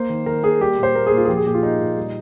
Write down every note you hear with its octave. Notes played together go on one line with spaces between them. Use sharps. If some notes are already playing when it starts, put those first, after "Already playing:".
Already playing: A#3 C5
D#3
D#3 A#4
A#3 G#4
G3 G4
A#2
C5
A#3 A#4
G#4
A#2
F4
G#4
F3 G4
G#4
A#2 G4
F4
A#3 D#4
A#2
G3